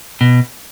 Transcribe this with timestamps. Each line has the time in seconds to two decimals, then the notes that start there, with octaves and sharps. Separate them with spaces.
0.21 B2